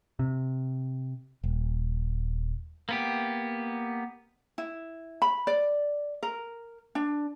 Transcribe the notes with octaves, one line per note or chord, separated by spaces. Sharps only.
C3
D#1
A#3 B3 G4
E4
B5
D5
A#4
D4